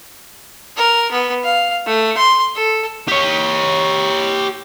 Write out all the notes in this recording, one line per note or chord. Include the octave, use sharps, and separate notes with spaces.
A#4
B3
F5
A3
C6
A4
G4 C#5